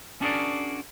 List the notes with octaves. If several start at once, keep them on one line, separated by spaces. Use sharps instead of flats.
C#4 D4 F#4 G#4 A#4 D5